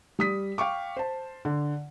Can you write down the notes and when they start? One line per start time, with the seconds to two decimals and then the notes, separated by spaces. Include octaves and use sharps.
0.19 G3 D#6 B6
0.58 F5 G5 C#6 D6
0.97 C5 A5
1.45 D3